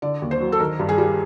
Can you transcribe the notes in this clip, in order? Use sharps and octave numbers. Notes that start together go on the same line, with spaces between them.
D3 D5
D#2
C5
F#3
A4
D#3 A#4
G2
G#4
G3